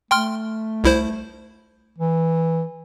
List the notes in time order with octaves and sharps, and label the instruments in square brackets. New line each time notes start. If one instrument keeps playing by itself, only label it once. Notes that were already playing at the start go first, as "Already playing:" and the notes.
[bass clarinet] A3 [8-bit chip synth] G5 C6 F6
[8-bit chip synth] C2 E4 C5
[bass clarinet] E3